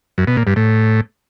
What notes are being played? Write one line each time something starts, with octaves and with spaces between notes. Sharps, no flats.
F#2
B2
A#2
G2
A2